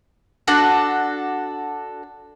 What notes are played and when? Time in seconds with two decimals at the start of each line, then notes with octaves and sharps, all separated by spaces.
0.47 D4 F#4 A4